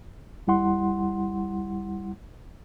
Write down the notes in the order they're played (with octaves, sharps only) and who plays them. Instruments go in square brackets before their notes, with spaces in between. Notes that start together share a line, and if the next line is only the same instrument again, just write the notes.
[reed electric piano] D#2 G3 E4 F#5 C6